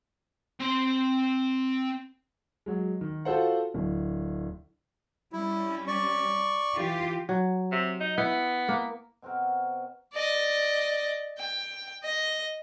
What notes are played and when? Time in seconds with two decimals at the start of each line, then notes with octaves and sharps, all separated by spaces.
0.60 C4 C6
2.66 F#3 G#3
3.01 D#3
3.25 F4 F#4 A4 C5 F#5
3.74 D1
5.33 G3 C#4 E4
5.88 D5 C#6
6.76 E3 F4 G4
7.29 F#3
7.72 C3
8.00 D#4
8.18 B3 E4
8.68 A#3 A#4
9.22 B2 C4 F#4 A#4
10.14 D5 D#5
11.39 G5
12.04 D#5